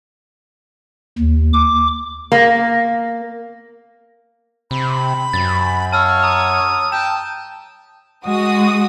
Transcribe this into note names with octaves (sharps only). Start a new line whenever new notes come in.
D#2
D6
A#3
C3 B5
F#2 A6
C#5 F5 A5 E6 F6
A#5 D#6
G5 A5 E7
G#3 F#4 D#6